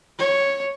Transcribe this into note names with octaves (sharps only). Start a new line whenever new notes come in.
C#5